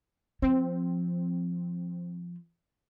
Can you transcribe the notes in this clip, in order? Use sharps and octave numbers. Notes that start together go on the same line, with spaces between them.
F3 C4